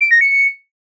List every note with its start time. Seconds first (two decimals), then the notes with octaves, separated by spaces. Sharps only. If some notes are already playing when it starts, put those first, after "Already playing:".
0.01 D7
0.11 A#6
0.21 C#7